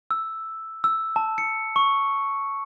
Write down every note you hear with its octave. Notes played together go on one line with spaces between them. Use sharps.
E6
E6
A5
C#7
C#6